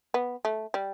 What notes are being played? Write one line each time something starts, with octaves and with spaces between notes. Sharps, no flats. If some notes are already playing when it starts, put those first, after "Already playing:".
B3
A3
G3